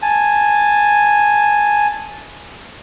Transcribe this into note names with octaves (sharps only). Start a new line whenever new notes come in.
G#5 A5